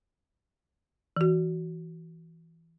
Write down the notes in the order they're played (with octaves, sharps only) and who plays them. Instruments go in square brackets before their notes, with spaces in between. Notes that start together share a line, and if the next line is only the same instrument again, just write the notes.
[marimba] E3 F#4